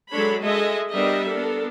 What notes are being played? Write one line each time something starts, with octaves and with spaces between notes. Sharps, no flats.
F#3 G#3 D4 A4 C#5 B5
G#3 A4 D#5 E5
G3 B3 D4 A#4 D#5 E5
B3 D4 A4 A#4